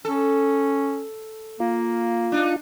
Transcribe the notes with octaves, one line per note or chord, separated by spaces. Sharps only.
C#4 A4
A#3 F4
D4 D#4